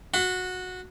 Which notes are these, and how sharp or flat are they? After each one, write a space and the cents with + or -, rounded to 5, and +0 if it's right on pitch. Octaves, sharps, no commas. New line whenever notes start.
F#4 -15 B5 +35